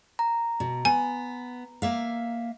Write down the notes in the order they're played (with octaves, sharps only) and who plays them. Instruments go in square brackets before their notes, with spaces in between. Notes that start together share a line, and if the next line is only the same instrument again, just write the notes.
[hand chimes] A#5
[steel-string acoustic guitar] B2
[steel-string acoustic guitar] B3 [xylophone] G#5
[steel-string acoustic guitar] A#3 E5 F5